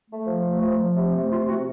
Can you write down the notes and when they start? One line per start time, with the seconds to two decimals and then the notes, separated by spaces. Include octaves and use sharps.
0.10 A3
0.27 F3
0.44 A3
0.62 F3
0.78 F3
0.96 C3
1.13 A3
1.30 C3 F4
1.48 C3 F#4